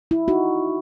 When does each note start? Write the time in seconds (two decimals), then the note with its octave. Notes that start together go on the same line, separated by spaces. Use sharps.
0.11 E4
0.28 D#4 F#4